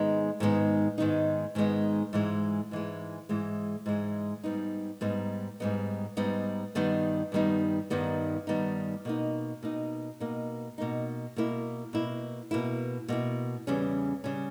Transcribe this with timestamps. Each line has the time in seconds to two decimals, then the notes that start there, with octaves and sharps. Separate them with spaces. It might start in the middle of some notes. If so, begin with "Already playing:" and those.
Already playing: G#2 D#3 G#3 B3 D#4
0.40 G#2 D#3 G#3 B3 D#4
0.98 G#2 D#3 G#3 B3 D#4
1.55 G#2 D#3 G#3 B3 D#4
2.13 G#2 E3 G#3
2.71 G#2 E3 G#3
3.29 G#2 E3 G#3
3.86 G#2 E3 G#3
4.44 G#2 G3 B3 D#4
5.01 G#2 G3 B3 D#4
5.60 G#2 G3 B3 D#4
6.17 G#2 G3 B3 D#4
6.75 G2 D#3 G3 B3 D#4
7.32 G2 D#3 G3 B3 D#4
7.90 G2 D#3 G3 B3 D#4
8.47 G2 D#3 G3 B3 D#4
9.05 B2 A#3 D#4
9.63 B2 A#3 D#4
10.20 B2 A#3 D#4
10.78 B2 A#3 D#4
11.36 B2 A#3 E4
11.93 B2 A#3 E4
12.51 B2 A#3 E4
13.08 B2 A#3 E4
13.67 E2 C#3 G3 C#4
14.24 C#3 G3 C#4